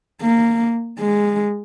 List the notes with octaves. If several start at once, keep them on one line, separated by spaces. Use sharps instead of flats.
A#3
G#3